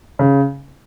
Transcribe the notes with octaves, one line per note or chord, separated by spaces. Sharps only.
C#3